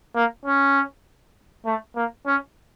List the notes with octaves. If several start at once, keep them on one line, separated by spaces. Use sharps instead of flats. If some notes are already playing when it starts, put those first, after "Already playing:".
A#3
C#4
A3
A#3
C#4